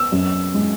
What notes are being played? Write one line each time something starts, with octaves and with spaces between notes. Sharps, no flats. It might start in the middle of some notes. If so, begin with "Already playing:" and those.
Already playing: B3 E6
F#2
G#3